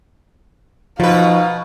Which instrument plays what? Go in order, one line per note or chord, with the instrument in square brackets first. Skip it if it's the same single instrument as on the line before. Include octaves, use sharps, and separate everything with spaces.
[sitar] B2 B4 [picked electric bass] F3 [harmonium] D#4 F#4 [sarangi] F5